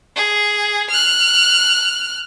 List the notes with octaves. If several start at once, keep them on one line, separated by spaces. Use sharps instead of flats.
G#4
F6 F#6